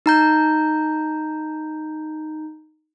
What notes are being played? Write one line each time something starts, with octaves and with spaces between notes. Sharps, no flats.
D#4 A#5 G6